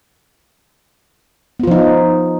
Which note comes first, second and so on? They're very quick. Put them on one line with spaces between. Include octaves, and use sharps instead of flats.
B3 F4 F3 D#4